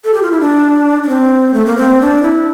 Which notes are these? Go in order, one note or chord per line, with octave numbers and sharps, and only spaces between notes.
A4
G4
F4
E4
D4
D4
C4
A3
A#3
C4
D4
E4